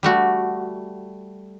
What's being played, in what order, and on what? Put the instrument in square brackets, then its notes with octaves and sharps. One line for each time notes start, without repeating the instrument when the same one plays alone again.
[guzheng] G3 A3 F#4